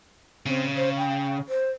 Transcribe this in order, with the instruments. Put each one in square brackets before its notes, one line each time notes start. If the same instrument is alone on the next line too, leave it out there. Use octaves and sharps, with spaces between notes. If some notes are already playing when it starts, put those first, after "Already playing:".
[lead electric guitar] C#3 [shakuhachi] C4
[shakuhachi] C5
G5
C5